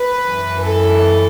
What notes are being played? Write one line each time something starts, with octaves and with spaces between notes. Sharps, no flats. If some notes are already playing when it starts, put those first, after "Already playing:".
Already playing: B4
F#2 E3
A4